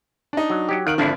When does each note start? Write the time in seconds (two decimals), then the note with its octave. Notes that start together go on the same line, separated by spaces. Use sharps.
0.33 D4 D#4
0.50 F#3
0.69 F#3 G4
0.87 D#3 D#5 F5 F#5 D7 F#7
0.98 G#1 D3 F3 D4 E4